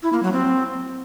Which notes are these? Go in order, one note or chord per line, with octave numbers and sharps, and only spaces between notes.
E4
A#3
F#3
C4